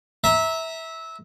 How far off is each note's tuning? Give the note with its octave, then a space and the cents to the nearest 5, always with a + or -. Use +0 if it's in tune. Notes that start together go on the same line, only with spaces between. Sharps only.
E5 -20 A#5 +0